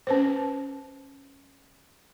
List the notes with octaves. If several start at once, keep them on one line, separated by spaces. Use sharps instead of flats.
C#4 B4 C5